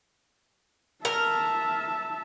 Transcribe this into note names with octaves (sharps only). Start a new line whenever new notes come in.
A#4 E5 A5